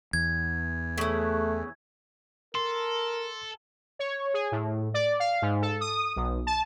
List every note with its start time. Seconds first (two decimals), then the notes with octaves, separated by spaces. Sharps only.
0.13 E2 G#6
0.98 C#3 E3 A3
2.55 A4 A#4 C6
3.99 C#5
4.34 G#4
4.52 A2
4.94 D5
5.20 F5
5.42 G#2
5.62 A4
5.81 D#6
6.16 B1
6.47 A5